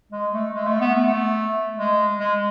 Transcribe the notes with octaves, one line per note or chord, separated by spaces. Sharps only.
G#3
A3
G#3
A3
B3
A3
G#3
G#3